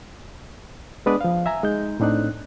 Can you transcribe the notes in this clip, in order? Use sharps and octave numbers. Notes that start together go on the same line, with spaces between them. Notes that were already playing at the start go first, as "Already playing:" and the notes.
G#3 B3 D4 B4 D5 D#6
F3 F5
E5 G#5 A#5
G#3 D#4 G6
A2 C4 D4 D#4 F#6